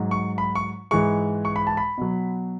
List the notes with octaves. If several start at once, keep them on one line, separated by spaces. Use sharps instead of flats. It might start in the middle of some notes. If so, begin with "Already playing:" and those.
Already playing: G#2 F#3
C#6
B5
C#6
G#2 E3 G#3 C#6
C#6
B5
A5
B5
B2 F#3